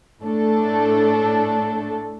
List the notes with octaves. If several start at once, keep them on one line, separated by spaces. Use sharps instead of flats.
A2 A3 D4 A4